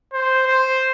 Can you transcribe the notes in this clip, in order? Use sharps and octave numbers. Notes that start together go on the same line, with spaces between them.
C5
C5